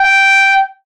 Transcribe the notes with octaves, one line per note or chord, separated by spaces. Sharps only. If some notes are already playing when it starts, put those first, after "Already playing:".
Already playing: G5